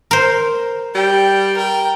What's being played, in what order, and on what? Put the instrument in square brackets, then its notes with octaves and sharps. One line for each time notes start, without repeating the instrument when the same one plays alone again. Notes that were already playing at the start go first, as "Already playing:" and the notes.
[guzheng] A#4 C5
[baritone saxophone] G3 [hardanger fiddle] G5
[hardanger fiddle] A#4 G5